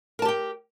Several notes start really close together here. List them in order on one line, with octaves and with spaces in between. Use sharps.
A#4 A5 G4 G5